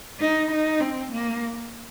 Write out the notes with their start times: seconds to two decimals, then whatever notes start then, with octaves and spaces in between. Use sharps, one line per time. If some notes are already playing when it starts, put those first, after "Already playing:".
0.19 D#4
0.51 D#4
0.80 C4
1.11 A#3